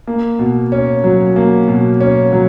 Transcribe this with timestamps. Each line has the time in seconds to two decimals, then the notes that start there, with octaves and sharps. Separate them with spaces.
0.07 A#3
0.39 B2
0.72 C#4
1.04 F#3
1.36 A#3
1.68 B2
2.01 C#4
2.32 F#3